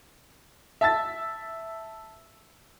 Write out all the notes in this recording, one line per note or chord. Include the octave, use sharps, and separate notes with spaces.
E5 A5 E6 A6